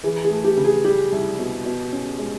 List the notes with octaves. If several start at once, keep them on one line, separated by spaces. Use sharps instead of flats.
E3 G#4
G#4
A3
G4
C#3
G#4
G3 G4
C2
B2
B2
C#4
G#3